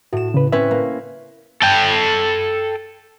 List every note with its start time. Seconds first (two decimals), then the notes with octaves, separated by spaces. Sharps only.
0.13 A2 F#4 E7
0.34 C#3 B4
0.52 C4 C#4 B4 E5
0.71 A#3
1.62 A4 G5